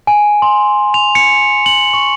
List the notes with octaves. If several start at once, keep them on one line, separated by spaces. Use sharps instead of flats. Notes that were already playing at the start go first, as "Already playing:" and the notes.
G#5
C6
F7
C#7
F#7
C#6